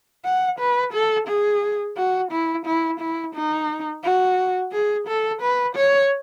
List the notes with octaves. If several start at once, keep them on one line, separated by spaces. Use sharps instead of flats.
F#5
B4
A4
G#4
F#4
E4
E4
E4
D#4
F#4
G#4
A4
B4
C#5